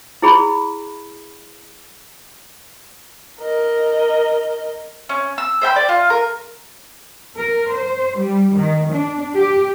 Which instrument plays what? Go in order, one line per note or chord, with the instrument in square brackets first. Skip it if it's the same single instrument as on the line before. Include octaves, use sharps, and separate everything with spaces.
[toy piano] E4 G#4 B5
[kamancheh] A#4 D#5
[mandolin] C#4
E6
C5 E5 G5 B5
D5
F4
A#4
[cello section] A#4
C5
G3
D#3
D4
G4